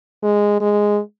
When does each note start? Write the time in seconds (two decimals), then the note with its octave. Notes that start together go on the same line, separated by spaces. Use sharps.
0.23 G#3
0.61 G#3